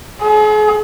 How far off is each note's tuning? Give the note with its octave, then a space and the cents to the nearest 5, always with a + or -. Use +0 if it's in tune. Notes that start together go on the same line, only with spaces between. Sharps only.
G#4 +40